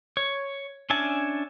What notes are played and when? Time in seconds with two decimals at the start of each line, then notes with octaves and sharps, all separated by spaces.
0.17 C#5
0.90 C#4 D4 E5 G#5 A5